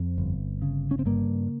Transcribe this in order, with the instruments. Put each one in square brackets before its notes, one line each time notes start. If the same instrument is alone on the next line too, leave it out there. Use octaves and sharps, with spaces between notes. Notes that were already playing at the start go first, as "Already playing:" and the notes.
Already playing: [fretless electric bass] F2 C4
G1
C#3
C#4
C4
G2 A#3